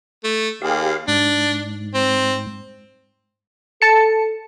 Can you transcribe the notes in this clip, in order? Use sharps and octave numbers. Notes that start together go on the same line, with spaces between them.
A3
D#2 G4 G#4 F5
G#2 D4
C4
A4 A5 C#7